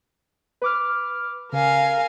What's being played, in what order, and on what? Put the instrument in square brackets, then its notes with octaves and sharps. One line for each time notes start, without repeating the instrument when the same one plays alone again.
[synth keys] B4 D6 F6
[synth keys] C#3 [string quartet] A#4 F5 G#5